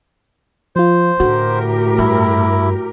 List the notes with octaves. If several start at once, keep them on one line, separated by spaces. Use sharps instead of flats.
F3 F4 C5
A2 D3 F#4 G4 A#4
G2 E4